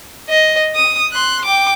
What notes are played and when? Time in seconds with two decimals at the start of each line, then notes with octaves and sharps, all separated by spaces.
0.29 D#5
0.75 D#6
1.12 C6 F#6
1.45 G5 D6